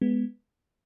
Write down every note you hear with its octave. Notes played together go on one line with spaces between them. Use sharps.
G#3 B3